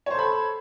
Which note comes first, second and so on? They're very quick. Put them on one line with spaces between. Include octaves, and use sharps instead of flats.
C#5 C5 A4 B5